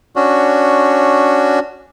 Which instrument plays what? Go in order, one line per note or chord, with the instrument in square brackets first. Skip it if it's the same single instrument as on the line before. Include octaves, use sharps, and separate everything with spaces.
[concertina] C#4 D4 F#4